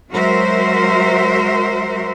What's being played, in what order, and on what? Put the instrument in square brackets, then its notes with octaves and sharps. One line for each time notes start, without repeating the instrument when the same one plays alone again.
[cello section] F#3 G#3 F#4 A#4 C5 E5